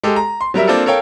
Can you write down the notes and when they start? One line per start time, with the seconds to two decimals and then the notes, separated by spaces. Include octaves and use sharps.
0.03 G#3 G4 A4
0.16 A#5
0.41 C6
0.54 F#3 G3 A#4 E5
0.68 A#3 C4 D4 F4 A4
0.86 A4 A#4 C#5 F5 G5